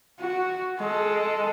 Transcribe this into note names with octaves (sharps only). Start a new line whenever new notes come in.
F#4
G#3 A4